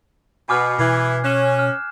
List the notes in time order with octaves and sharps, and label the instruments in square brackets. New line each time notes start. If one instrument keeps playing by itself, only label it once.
[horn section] B2 [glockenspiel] G#5 D6 F6
[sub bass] B2 [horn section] E3 [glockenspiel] D6 G#6 C7
[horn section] C#4 [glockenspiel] F#6 E7
[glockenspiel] F6